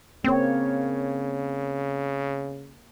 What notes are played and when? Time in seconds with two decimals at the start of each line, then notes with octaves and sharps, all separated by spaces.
0.24 C#3 A#3 C4 C#5